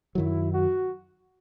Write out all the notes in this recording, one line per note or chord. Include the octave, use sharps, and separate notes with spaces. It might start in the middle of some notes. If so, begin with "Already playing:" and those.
F#2 D#3 F#3 E4
F#4